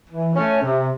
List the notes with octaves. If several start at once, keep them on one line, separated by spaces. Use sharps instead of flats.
E3
A3 C#4
C3